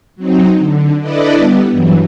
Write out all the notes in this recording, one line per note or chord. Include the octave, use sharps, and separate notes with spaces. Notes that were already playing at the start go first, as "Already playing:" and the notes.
F#3 C4 D#4
D3
D4 E4 A4 B4 D5 D#5
G3 B3
G2 E3 F#3